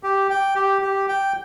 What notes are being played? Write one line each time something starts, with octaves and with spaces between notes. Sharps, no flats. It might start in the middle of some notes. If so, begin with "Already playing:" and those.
G4
G5
G4
G4
G5